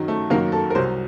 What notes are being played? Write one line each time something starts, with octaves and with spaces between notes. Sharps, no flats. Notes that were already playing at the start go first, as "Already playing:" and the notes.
Already playing: F#2 D#3 F#3
A3
F#2 D#3 F#3 A#3
A4
A#4
C2 C3 F#3 C5